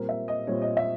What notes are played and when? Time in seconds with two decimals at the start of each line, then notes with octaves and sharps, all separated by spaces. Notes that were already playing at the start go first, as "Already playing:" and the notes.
Already playing: A#2 G3 C4 A#4
0.09 E5
0.28 D#5
0.47 A#2 G3 C4 C#5
0.62 D#5
0.77 E5